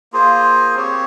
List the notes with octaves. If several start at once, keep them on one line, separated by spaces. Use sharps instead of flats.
A#3 F4 G#4 C5
C4 G4 C#5